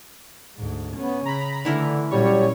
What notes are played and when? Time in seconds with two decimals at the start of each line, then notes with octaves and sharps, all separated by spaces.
0.56 D2 G#2
0.97 B3 C#4
1.26 C#3 A#5 B5
1.65 D3 E3 A3 E4 A#4
2.11 A#2 F#3 G3 C#4 C#5